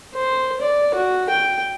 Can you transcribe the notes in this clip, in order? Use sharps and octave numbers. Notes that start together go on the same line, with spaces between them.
C5
D5
F#4
G5